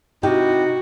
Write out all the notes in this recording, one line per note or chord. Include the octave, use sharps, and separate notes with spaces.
C3 D#4 E4 F#4 G4